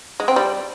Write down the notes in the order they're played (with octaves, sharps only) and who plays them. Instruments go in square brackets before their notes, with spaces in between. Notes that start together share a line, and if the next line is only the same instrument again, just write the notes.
[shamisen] G#3
C4
G3